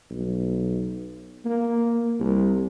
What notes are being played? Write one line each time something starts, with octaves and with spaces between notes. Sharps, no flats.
B1
A#3
C2